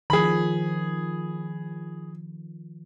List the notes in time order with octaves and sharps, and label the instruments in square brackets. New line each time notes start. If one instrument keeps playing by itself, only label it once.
[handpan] D#3 F3 [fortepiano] G#4 B5